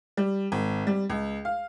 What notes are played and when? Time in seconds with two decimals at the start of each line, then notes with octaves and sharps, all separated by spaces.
0.17 G3
0.52 G#1
0.87 G3
1.10 C#2
1.45 F5